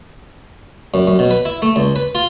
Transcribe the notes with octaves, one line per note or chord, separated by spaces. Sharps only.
F#2
F#2
B2
B4
E4
A3
C#2
B4
F4